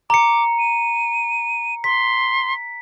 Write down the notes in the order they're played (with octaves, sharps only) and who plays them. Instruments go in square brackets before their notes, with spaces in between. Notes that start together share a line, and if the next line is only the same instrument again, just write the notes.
[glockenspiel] A#5 C#7 [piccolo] D6
[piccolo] D#7
[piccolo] C6 [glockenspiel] B6